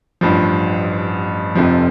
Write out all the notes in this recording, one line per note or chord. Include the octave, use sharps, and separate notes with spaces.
A1 G2 F3
F1 F2 C3 F3